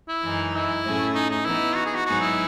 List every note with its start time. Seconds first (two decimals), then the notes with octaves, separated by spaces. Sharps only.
0.09 E4
0.24 F#2 E3 G#3 D#4
0.55 E4
0.84 A2 F#3 A3 C#4 G#4
1.15 D#4
1.30 D#4
1.45 E3 B3 D#4 E4
1.75 F#4
1.86 G#4
1.95 F#4
2.06 G#2 F#3 B3 D#4 F#4 G#4
2.20 E4